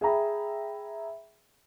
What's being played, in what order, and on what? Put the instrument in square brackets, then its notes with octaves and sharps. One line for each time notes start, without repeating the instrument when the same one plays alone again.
[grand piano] G#4 E5 G5 A#5 B5